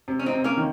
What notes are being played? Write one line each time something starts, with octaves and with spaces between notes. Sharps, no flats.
C3
C#4
C4 D#4
C3
A#3 C#4
D#3